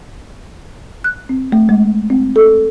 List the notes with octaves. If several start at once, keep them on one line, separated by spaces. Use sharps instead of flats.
F#6
C4
A3
G#3
C4
A4